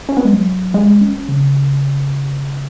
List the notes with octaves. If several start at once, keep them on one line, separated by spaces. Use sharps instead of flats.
C#4
B3
G#3
F#3
G#3
C#4
C#3